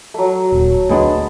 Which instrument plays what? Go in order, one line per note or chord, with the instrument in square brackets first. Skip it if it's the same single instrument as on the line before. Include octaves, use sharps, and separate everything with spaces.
[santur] F#3 A3
[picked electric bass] D#1
[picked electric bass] D2 G3 D4 [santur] G#3 B3 A5